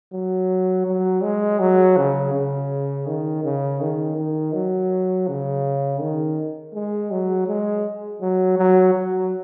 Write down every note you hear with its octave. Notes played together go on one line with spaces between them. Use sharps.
F#3
F#3
G#3
F#3
C#3
C#3
D#3
C#3
D#3
D#3
F#3
C#3
D#3
G#3
F#3
G#3
F#3
F#3
F#3